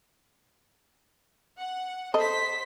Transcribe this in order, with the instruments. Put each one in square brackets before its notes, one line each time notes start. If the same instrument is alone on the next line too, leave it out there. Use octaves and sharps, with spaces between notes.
[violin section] F#5
[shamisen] A4 D#5 [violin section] C5 B6